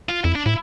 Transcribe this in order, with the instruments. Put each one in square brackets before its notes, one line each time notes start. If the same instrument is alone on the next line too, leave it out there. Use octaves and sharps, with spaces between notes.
[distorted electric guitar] F4
[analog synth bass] F2 [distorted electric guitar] E4
[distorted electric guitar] D4
[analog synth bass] A2 [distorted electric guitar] E4